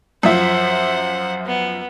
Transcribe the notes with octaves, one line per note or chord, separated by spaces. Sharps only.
F#2 F3 C5 E5 F#5
B3